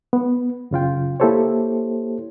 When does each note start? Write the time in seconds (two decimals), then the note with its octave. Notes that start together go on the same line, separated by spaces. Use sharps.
0.13 B3
0.71 F#2 C#3 F4 G5
1.20 A#3 E4 G4 A4 C5 C#5